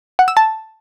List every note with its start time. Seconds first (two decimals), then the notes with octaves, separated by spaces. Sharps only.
0.19 F#5
0.28 E6
0.37 A5